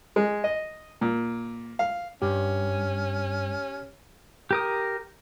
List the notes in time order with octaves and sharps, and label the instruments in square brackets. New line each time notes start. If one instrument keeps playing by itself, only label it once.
[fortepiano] G#3
D#5
A#2
F5
[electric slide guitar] G2 [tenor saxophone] C#4 [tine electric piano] G4
[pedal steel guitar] G4 A#4 D#6